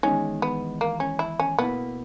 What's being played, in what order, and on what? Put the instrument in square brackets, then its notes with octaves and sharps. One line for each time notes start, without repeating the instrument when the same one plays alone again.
[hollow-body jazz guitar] E2 D#3 G#3 D#4 [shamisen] C#4
[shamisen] B3
A#3
C#4
E4
C#4
[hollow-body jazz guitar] B2 A#3 E4 [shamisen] B3